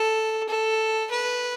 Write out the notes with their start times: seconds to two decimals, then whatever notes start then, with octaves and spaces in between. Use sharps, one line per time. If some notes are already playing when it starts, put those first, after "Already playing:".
Already playing: A4
0.49 A4
1.10 B4